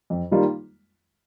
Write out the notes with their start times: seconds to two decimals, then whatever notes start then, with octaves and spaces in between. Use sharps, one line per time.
0.10 F2
0.31 D#3 G3 A#3 F4